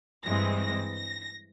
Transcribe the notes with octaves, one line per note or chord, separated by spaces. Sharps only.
G2 E3 G#3 C4 A#6
A#6
A#6